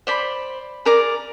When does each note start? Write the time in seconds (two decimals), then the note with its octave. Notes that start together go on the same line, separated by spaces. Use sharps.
0.07 C5 D5 B5
0.85 G#4 A#4 D5 A#5